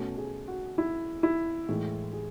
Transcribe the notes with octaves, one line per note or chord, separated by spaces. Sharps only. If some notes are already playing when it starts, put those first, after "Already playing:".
Already playing: B2 A3 C#4 F#4
G#4
F#4
E4
E4
A2 E3 G#3
G#4